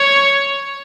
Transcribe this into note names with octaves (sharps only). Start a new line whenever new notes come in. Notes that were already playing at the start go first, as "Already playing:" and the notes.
Already playing: C#5